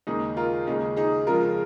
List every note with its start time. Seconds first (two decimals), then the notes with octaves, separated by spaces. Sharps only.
0.07 D#2 C#3 G#3 D#4 G#4
0.37 F4 A#4
0.67 D#2 C#3 G#3 D#4 G#4
0.97 D#4 G#4
1.27 F2 C#3 G#3 F4 A#4